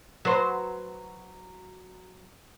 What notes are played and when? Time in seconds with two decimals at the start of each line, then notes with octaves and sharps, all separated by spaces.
0.25 F#3 B4 C5